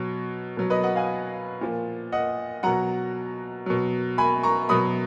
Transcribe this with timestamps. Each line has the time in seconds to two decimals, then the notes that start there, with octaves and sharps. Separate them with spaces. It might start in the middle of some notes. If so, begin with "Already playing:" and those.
Already playing: B2 F#3 C#5
0.57 B2 F#3
0.70 B4 D#5
0.83 D#5 F#5
0.96 F5 G#5
1.61 A#2 F3
2.12 D#5 F#5
2.63 B2 F#3 F#5 A#5
3.66 B2 F#3
4.18 G#5 B5
4.43 A#5 C#6
4.69 B2 F#3 B5 D#6